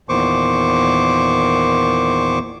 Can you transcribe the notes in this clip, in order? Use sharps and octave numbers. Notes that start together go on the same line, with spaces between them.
E2 A#2 D#3 C5 C#6 D6